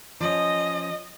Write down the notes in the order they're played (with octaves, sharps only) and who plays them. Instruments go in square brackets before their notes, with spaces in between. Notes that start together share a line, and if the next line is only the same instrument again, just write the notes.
[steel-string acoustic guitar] F3 C#4 [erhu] D#5